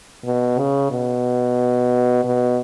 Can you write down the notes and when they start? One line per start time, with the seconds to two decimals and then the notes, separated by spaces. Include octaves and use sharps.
0.24 B2
0.58 C#3
0.91 B2
2.24 B2